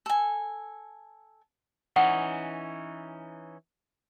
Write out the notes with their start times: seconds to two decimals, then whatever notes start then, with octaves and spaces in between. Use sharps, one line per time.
0.06 A4 G#5
1.96 E3 C#4 D#4 F#5